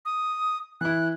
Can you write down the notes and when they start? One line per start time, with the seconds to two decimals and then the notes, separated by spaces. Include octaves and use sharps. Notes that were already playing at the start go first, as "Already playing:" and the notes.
0.05 D#6
0.81 E3 E4 F#6